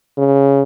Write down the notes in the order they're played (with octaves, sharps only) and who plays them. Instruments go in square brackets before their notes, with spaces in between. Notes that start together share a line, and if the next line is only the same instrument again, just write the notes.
[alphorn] C#3